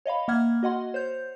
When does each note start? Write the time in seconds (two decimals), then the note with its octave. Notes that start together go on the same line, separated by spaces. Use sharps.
0.06 C#5 D#5 F5 B5
0.28 A#3 E5 F#5 F6 G#6
0.63 F#4 D#5 F#5 C6
0.94 C5 C#5 G6